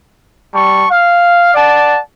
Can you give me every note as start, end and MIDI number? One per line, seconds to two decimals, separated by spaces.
0.54 0.86 55
0.54 0.86 81
0.54 0.86 85
0.91 1.50 77
1.55 1.99 74
1.55 1.99 78
1.55 1.99 81